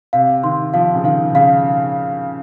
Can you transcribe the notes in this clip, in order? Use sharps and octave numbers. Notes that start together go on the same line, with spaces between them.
C3 F5
D#3 C6
F3 F5
C#3
D#3 F5
C#3 F5